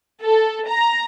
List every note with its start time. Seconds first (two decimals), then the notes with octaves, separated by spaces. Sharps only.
0.22 A4
0.67 A#5